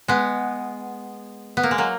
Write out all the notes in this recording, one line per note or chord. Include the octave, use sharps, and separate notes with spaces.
G#3 B3
B3
A#3
G#3
F#3 A#3